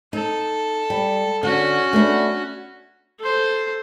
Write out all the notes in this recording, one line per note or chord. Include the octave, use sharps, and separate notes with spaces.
D#4 A4
G3
D3 C#4 F#4
A3 B3 D4
A4 C5